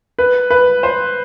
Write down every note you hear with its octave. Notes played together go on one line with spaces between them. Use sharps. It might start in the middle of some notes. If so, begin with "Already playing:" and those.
B4
B4
C5